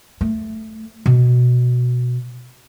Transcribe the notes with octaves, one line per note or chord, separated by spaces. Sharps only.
A3
B2